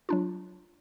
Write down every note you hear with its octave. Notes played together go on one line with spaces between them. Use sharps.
F#3 D4 F4